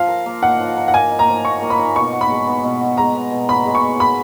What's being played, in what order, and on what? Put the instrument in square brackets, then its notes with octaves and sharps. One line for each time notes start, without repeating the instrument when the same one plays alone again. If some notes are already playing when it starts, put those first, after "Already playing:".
Already playing: [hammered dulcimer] F3 [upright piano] F5
[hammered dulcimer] A#4
A#3
[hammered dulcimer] D#4 [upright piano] F#5
[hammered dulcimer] F3
A#4
[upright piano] F#5
[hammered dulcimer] A#3 [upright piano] G#5
[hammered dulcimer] D#4
[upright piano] A#5
[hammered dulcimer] F3
[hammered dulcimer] A#4 [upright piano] C#6
[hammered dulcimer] A#3
[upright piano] B5
[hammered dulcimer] D#4
[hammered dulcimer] B2 [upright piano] C#6
[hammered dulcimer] F#4
[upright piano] B5
[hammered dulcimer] G#3
B3
B2
F#4
[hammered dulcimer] G#3 [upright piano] A#5
[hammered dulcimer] B3
B2
[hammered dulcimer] F#4 [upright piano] B5
[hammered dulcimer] G#3
[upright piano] C#6
[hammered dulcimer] B3
[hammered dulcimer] A#3 [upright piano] B5